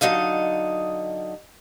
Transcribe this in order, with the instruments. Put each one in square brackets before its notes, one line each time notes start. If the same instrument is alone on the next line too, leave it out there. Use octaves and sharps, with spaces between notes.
[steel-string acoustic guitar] D3 F#3 D#4 D#5 F5